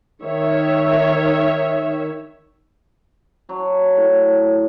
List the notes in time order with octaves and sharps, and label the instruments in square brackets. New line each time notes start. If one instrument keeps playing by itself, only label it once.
[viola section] D#3 C#5 E5
[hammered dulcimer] F#3 D4
A2